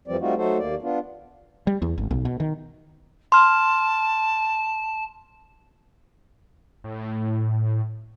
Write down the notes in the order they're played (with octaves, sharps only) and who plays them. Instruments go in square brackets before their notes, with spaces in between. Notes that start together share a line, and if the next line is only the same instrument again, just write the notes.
[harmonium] F2 E3 F3 G3 C4 D5
G3 A3 C4 D#4 F4 F#4
F#3 A3 D#4 F#4 A4 C5
D#2 A#3 D5
B3 D4 F4
[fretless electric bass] G3
E2
G#1
B1
B2
D#3
[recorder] A5 [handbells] C6 F6
[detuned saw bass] A2